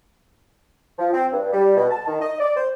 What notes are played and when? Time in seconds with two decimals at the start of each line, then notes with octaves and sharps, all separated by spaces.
0.98 F3
1.13 C4
1.31 G2
1.52 G3
1.77 B2
1.90 A5
2.07 D#3
2.21 D#5
2.39 D5
2.57 C5